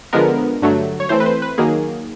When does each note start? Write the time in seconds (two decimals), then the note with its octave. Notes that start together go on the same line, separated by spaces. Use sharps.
0.13 D3 F3 G#3 B3 A#4
0.62 G2 D3 F#3 A3
1.00 C#5
1.09 E3 A3 C4 C5
1.20 B4
1.26 C5
1.42 B4
1.58 D#3 F#3 A#3 G#4